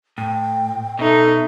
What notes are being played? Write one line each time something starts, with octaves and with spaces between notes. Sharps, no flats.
A2 G5
B2 D#4 A4 E5